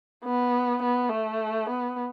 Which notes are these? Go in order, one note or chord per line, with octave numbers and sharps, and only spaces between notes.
B3
B3
A3
B3